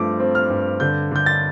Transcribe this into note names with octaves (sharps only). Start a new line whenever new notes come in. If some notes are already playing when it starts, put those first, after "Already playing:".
Already playing: G2 F3 A3 C4 D6
C4
F6
G2
D3 G6
D3 G6
A6